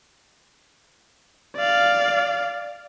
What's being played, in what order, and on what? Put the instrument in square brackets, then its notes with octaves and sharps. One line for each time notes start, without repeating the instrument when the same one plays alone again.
[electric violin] D5 F5